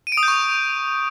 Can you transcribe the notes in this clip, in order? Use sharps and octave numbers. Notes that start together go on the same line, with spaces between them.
D#7
D7
D#6
G6
C#6